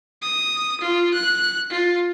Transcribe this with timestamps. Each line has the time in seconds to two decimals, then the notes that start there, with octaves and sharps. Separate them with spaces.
0.22 D#6
0.81 F4
1.14 F#6
1.70 F4